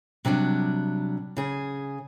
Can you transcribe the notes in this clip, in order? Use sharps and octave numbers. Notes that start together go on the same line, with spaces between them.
C3 F#3 G3 D4
C#3 G#4